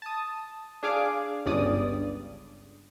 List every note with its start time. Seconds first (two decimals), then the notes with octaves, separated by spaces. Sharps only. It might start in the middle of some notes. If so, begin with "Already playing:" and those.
0.02 A5 D#6
0.83 D4 G#4 F5 D6
1.46 G1 C#2 G2 D5 D#6